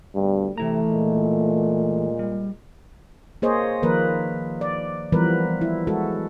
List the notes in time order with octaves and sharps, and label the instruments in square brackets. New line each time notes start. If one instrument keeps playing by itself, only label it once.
[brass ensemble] D2 B2 G3 [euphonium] G2
[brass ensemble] C3 [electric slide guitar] E3 E4 A#5 [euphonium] A3
[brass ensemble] A#2 G#3
[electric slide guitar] G3
[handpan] A#3 G#4 C5 C#5 D#5
D#3 F3 A#3 A#4 B4
D5
E3 F3 G3 B3 A#4 B4
E4
G#3 F#4 A4